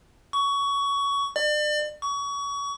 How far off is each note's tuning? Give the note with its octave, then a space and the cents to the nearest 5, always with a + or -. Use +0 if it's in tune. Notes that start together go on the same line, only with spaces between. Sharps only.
C#6 +20
D5 +35
C#6 +30